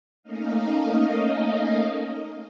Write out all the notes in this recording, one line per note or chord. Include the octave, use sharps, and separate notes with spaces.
A3 A#3 C#4 D#4 D#5 F5